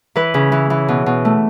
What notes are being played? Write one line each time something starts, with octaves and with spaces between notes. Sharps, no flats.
E3 B4
C#3
E3
E3
B2
B2
A3